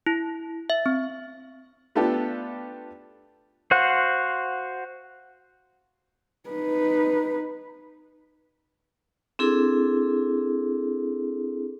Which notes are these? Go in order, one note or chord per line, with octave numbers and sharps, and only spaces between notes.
E4
E5
C4
A3 B3 D4 F4 G4 A4
F#4 C5 F5 F#5
D#4 B4
C4 D4 E4 G#4 A4